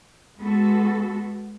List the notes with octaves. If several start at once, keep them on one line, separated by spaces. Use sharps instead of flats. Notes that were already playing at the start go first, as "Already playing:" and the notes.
G#3 B3 F#4 A4